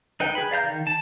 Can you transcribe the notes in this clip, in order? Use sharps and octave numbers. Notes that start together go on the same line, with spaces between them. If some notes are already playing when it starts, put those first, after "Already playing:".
D#4 B4 G5
G#4 B4 B5
D5 F5 A#5 G6
D#3
A5